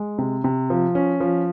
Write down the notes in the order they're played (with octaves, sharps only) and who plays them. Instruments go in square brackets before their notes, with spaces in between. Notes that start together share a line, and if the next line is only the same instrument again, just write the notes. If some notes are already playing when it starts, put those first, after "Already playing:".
Already playing: [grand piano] G#3
C3
C3
F3
C#4
F3